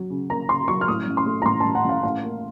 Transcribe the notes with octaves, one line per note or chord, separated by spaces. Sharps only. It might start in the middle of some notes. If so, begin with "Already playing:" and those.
Already playing: F#3
C#3
A#3 A#5
C#3 C6
F#3 C#6
F6
A2 D#6
A1
C6
A3
A#5
A1 C6
A1 A5
F#5
A1 F5
A2 F5
A#3